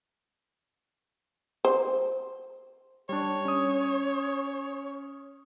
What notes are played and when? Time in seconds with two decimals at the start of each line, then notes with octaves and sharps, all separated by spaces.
1.65 C5
3.09 G3 D4 C#5
3.45 C#4 D#6